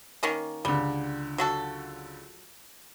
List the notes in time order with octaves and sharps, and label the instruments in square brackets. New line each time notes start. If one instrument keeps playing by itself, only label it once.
[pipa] D#3 A#3 C#4
[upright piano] C#2 D3 [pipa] G3
[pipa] F#3 F#4 A4